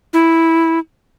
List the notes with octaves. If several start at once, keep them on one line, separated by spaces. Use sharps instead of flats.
E4